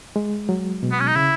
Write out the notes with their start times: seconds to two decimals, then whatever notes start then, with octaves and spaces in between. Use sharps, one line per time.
0.16 G#3
0.49 F#3
0.83 B2
0.92 B3
1.00 C#4
1.08 D#4
1.16 C#3 E4